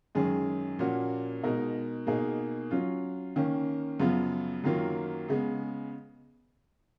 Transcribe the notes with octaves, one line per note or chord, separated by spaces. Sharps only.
F#2 D#3 G#3 C#4 G#4
A#2 F3 A#3 C#4 F#4
B2 G#3 D#4 A#4
B2 A#3 D#4 G#4
F#3 C#4 F4
D#3 A#3 C#4
F#2 C#3 F3 B3 F4
F#2 D#3 F#3 A#3 F4
C#3 G#3 B3